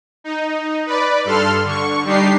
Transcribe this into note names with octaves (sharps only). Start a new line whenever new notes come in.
D#4
B4 D5
G2 A4 C6 F6
D3 C#6
G3 D4 D#4 G4 C7